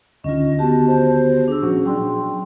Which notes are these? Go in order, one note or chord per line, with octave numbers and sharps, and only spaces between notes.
D2 D3 D#3 C#4 F4 D#5
B3 F#4 G4 A5
C5
D4 G#4 E6
A#2 F3 C#4 F#4
F#3 D4 G5 C6